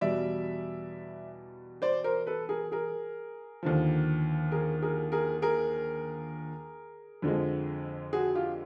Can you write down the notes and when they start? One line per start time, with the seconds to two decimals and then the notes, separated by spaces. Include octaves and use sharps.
0.01 E2 B2 G3 D5 E5
1.82 C5 D5
2.04 A#4 C5
2.27 A4 B4
2.49 G#4 A#4
2.72 G#4 A#4
3.63 D#2 D3 F3
4.52 G#4 A#4
4.82 G#4 A#4
5.12 G#4 A#4
5.42 G#4 A#4
7.22 F2 D3 F3 G#3
8.13 F#4 G#4
8.35 F4 G4